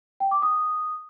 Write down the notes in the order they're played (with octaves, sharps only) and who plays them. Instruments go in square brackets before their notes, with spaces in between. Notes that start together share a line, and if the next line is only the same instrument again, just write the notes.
[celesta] G5
D6
D#6